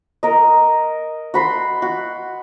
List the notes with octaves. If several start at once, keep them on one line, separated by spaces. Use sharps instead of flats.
A#4 D#5
F#4 B5 C6
F#4